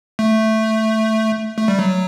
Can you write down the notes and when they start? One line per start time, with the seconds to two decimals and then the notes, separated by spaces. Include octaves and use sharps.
0.19 A3
1.58 A3
1.68 G3
1.79 F#3